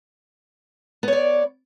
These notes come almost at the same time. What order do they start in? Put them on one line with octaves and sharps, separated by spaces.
B3 C#5 D5